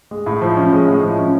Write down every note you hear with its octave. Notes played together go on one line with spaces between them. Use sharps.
G#3
A2
F3
C#4
G#3
A2
F3
C#4